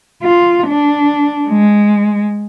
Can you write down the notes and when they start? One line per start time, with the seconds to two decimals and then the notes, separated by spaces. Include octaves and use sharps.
0.22 F4
0.67 D4
1.49 G#3